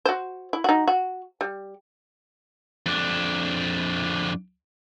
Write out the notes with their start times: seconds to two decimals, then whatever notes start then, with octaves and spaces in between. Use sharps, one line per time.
0.05 F#4 C5
0.53 E4
0.64 D#4 F#4
0.87 F#4
1.41 G3
2.86 F2 D4